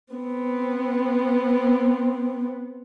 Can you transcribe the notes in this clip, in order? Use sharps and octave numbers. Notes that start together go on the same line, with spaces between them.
B3 C4